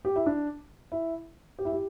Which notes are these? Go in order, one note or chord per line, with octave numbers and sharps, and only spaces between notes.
G4
E4
D4
E4
G4
E4
G4